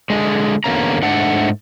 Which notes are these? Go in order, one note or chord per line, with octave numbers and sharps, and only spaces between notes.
D3 G#3
E2 G2 D3 A#3 C#4 A#5
G#2 A3 D4 F#5